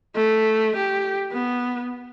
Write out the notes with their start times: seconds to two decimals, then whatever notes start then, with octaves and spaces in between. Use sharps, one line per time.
0.16 A3
0.76 G4
1.32 B3